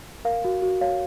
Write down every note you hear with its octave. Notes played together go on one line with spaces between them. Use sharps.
A#4 F5
F#4
F#4
C#5 F5